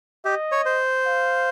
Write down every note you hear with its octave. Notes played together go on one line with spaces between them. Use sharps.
G4 D#5
C#5
C5
F5